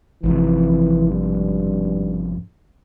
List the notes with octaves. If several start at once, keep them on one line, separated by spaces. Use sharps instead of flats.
G#1 F2 C3 E3
G2